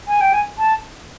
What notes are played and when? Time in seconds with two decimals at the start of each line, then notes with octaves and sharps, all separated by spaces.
0.07 G#5
0.21 G5
0.33 G#5
0.58 A5